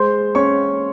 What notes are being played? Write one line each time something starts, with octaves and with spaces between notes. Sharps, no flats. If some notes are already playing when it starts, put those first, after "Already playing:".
Already playing: G#3 C5 C6
C#4 C#5 C#6